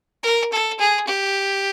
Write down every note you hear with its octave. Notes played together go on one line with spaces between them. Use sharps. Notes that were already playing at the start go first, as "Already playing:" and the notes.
A#4
A4
G#4
G4